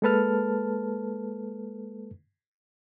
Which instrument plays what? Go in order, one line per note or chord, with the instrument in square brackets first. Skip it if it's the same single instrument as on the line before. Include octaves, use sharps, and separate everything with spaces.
[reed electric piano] G#3 A#3 A4 B4 A5 F6